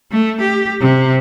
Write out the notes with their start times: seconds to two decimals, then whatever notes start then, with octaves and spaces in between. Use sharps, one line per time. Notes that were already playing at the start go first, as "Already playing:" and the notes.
0.12 A3
0.41 G4
0.81 C3